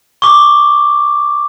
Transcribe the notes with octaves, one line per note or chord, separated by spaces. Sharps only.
C#6 D6